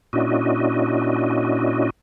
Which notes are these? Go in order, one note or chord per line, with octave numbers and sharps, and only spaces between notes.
A#2 C#4 D4 E4 F#4 D#5